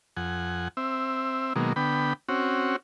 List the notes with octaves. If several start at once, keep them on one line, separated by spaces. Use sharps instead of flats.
F2 F#5 G#5
C4 E5
B2 D#3 F#3 G#3 A#3
D3 B3 G5 B5
C4 C#4 F#4